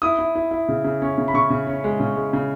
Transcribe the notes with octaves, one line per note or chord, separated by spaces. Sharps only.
E4 D#6
E4
E4
E4
C#3
C#3
C#4
C#3
B5
C#3 C#6
C#3
C#4
G#3
C#3
G#3
C#3